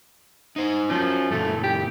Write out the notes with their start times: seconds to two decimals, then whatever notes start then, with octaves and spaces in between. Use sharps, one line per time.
0.56 D#4 C5
0.90 F3 F#3 C#4
1.31 F#2 A#2 E3 A3
1.63 G4